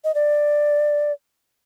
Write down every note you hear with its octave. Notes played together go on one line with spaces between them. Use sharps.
D#5
D5